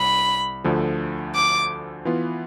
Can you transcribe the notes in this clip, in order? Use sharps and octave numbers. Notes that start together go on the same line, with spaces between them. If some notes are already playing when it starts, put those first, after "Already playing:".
Already playing: C2 B5
D2 D3 F3 A3
D6
E3 B3 F4